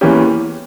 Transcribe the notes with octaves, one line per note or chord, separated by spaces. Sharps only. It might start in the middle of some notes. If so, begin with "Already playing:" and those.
E2 E3 A#3 C#4 G4